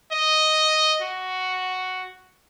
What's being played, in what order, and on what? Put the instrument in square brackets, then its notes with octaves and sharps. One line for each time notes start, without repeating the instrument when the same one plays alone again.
[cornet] D#5
F#4